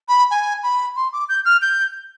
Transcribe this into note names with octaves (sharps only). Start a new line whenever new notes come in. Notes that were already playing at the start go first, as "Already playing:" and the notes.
B5
G#5
B5
C6
D6
G6
F6
G6